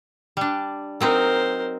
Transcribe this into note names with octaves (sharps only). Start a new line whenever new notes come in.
G3 D4
F#3 C4 D#4 A#4 C5